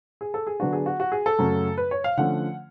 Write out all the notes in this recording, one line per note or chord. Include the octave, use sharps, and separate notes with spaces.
G#4
A4
G#4
D3 F#3 B3 D4 F#4
G#4
F#4
F#4
G#4
A4
F#2 C#3 F#3 A3 C#4
B4
C#5
F5
D3 F3 A3 C#4 F#5